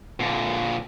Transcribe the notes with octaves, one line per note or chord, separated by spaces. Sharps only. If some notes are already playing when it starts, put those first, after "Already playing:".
A#2 D3